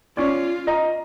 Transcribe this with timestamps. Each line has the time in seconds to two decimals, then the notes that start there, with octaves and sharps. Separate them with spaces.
0.17 C#4 F4 D5
0.67 D#5 A#5